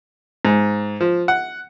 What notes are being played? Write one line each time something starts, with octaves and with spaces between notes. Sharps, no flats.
G#2
F3
F#5